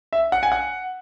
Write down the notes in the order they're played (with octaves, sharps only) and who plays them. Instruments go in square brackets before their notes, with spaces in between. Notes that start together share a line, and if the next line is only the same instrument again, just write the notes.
[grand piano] E5
F#5
G#5
F#5